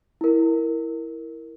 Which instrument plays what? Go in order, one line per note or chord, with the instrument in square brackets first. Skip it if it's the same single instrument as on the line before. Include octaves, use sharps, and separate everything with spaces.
[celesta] E4 A#4